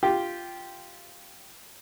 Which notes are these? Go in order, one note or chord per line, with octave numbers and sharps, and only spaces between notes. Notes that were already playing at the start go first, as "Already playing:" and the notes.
F4 G4